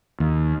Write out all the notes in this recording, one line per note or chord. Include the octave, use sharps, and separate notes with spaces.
D#2